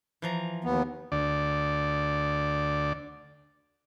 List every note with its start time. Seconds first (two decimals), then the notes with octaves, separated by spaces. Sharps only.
0.22 E3 F3 A#5
0.64 D#2 B3
1.12 D2 D5